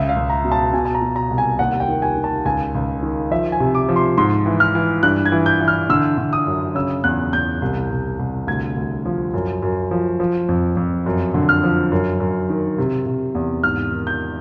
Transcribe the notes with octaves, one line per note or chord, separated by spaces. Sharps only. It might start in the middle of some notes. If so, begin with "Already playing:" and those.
Already playing: C#2 E5
F5
C#2
A#5
B2
A5
B2 G#5
A5
A#5
B2
A#5
C2
G#5
D#2 F#5
G5
D#3
G#5
D#3
A5
C#2 G#5
C#2
D#3
F3 E5
G#5
C3
D6
F3
C6
G#2 C6
E3
F6
E3
G2 F#6
G#6
E3
G6
E3
F6
D3 E6
D3
D#6
F#2
C#3 E6
E2 F#6
E2 G6
C2
C2
C2
D2 G#6
D2
F3
F#2
F#2
F3
F3
F2
F2
F#2
D3
F6
F3
F#2
F#2
D#3
C3
C3
E2
G#2 F6
D#3
G6